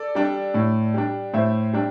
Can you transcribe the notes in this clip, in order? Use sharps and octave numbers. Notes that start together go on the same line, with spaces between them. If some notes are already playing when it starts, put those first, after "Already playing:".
Already playing: A4 D5
G3 D4
A2
G3 D4
A2 C5 E5
G3 D4